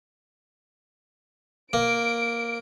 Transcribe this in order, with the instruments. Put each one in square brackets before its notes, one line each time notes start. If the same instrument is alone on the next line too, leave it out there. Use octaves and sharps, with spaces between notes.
[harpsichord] A#3 [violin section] D7